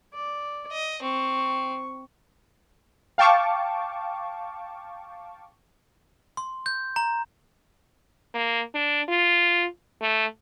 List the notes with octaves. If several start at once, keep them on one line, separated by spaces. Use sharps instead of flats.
D5
D#5
C4 C#6
F5 G5 A5 C#6 D6
C6
G6
A#5
A#3
D4
F4
A3